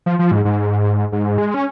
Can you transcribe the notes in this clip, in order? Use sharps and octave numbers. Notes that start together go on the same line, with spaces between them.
F3
F3
G#2
G#2
G#2
G#3
C#4